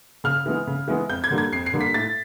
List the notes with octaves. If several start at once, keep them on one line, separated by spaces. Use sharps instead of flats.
C#3 F6
E3 G#3 B3
C#3
E3 G#3 B3
F2 G6
G#6
D3 G3 A#3 D4
G#6
F2 C7
C7
D3 G3 A#3 D4
B6
A2 A6